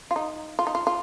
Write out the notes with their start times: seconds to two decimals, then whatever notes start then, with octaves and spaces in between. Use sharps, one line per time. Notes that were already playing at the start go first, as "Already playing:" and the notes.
0.11 F4
0.16 D#4
0.59 F4
0.67 D#4
0.75 F4
0.87 F4